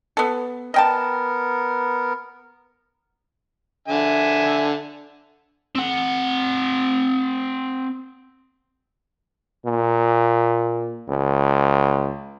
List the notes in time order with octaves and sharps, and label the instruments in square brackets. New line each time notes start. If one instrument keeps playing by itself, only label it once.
[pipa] B3 A4
[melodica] B3 A#4 [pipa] D#5 G5 A5
[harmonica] D3 E5 G#5
[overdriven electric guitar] C4 F#5
[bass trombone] A#2
C#2